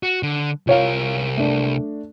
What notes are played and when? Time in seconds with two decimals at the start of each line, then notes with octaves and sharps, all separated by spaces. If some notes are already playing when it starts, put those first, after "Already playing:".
0.03 F#4
0.23 D3
0.67 C2 F4 A#4 C#5 F5
1.37 A3 D4